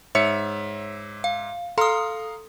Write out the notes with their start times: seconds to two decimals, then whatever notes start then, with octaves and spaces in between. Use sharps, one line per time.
0.15 G#2 C#5 E5 C#7
1.24 F5
1.78 A4 F5 A#5 C6 D#6